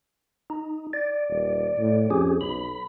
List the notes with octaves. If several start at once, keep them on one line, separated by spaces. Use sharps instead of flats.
D#4
D5
D#1
A2
F2 C#4 G4 G#4
B1 B5